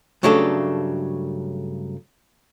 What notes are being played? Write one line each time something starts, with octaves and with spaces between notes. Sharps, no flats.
G2 C#3 F#3 A3 D4 A4